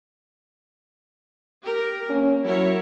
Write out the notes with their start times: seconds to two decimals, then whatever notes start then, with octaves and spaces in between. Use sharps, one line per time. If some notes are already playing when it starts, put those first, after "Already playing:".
1.62 G4 A#4
2.10 A#3 C#4
2.45 F#3 E4 A#4 C#5